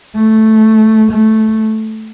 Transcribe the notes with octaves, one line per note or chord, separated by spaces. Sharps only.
A3
A3